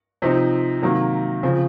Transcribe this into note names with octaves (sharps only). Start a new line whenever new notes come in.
C3 F3 C4 D#4
C3 D#3 F#3 A#3
C#3 F3 C4